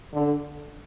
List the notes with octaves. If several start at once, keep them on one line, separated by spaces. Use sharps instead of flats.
D3